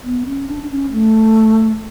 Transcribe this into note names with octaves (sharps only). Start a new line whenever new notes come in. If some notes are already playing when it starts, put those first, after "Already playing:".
B3
C#4
D4
D4
C#4
A3